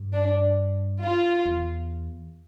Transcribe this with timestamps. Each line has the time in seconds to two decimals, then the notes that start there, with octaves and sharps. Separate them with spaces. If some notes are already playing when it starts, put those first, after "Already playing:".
Already playing: G2
0.13 D4
1.01 F4
1.46 E2